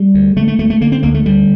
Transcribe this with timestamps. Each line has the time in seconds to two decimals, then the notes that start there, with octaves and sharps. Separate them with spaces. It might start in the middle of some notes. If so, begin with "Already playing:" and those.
Already playing: G3
0.14 D2
0.36 D3 A3
0.48 A3
0.59 D2 A3
0.70 A3
0.81 D3 A#3
0.92 C4
1.03 D2 A#3
1.14 A3
1.26 D3 G3